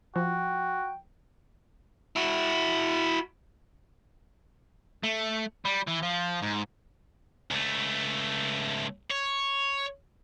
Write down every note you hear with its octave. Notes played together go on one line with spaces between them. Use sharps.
F3 F#4 G5
E4 F#4
A3
G3
E3
F3
G#2
C#2 A3
C#5